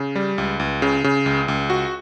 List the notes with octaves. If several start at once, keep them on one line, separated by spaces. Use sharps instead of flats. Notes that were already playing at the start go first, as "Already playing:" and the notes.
Already playing: C#3
G3
C#2
C#2
C#3
C#3
C#2
C#2
F#4